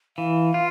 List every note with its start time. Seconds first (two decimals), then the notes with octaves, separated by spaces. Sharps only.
0.17 E3 F5
0.54 F4